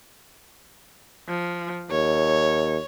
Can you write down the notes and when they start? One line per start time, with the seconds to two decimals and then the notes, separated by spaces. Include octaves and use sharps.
1.28 F3
1.90 D#2 C#5